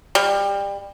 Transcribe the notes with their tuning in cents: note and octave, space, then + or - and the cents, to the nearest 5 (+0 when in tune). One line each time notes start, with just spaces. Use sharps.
G3 +25